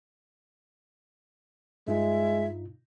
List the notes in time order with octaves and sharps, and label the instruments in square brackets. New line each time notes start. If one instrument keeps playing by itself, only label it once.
[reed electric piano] G2 D#4 F4 [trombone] G#3 [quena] E5